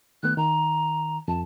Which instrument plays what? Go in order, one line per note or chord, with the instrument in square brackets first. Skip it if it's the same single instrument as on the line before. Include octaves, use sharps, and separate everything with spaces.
[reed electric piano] D#3 A3 B3 [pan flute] F#6
[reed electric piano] D#3 [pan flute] A#5
[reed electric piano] F2 [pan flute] A5